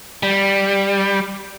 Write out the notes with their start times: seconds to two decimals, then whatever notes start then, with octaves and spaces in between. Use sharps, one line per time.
0.23 G3